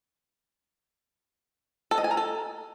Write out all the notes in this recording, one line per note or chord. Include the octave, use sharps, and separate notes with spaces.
A4
D#5
G#5
A#4
A4